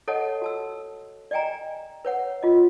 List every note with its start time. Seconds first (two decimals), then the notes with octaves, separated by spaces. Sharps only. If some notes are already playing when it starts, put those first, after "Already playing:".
0.08 A4 C#5 D#5 F#5 A5
0.42 F#4 A5 E6
1.31 D5 D#5 G5 G#5 A#5
2.05 B4 C#5 F#5
2.43 F4 D#5